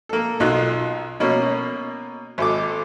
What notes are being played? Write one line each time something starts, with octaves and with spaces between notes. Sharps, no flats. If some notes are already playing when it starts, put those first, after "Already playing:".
A#3 A4
B1 D#4 F4 F#6
B2 A#3 C#4
G#1 A4 D6